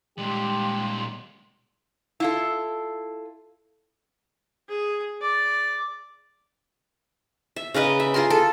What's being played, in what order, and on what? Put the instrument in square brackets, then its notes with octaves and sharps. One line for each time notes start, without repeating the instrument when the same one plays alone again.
[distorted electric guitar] A#2 G3 [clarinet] G#3 [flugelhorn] G4 [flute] C6
[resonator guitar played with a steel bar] E4 F4 A4
[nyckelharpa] G#4
D5
[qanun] E5
C#3 A#4 B4 D#5
E5
F4 G#4 A#4 C6
A4